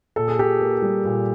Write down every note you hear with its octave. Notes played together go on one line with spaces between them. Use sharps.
A#2 A4
G#4
A#2 G4 A4
A#3
G3
A#2